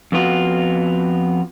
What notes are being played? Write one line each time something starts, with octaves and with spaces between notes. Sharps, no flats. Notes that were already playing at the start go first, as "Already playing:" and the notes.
F2 B3 F4 F#4